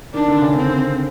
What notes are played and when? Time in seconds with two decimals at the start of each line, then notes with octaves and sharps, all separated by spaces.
0.14 D#3 D4
0.28 D3
0.42 C#3
0.56 D3 C4